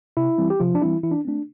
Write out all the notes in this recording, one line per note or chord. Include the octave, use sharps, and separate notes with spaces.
C3 E4
E3 G3 C4
G4
C3 F3 F4
D4
E3 G3 C4 E4
E3 E4
D4
A3 C4 D4